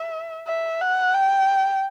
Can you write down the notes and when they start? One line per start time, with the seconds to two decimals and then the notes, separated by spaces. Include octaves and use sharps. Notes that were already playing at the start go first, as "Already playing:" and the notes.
Already playing: E5
0.47 E5
0.81 F#5
1.15 G5